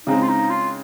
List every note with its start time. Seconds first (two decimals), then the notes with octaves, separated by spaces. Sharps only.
0.06 C#3 G#3 C4 D#4
0.22 F4
0.28 D#4
0.50 F4